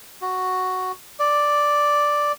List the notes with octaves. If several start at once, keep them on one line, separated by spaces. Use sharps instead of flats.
F#4
D5